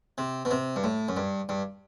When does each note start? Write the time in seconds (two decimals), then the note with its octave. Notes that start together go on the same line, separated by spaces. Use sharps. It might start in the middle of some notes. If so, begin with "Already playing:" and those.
0.18 C3
0.45 B2
0.51 C3
0.76 G2
0.84 A2
1.09 F#2
1.17 G2
1.49 G2